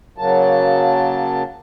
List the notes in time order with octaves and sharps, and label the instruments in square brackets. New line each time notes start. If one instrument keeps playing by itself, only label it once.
[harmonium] C#3 F#3 A#3 A5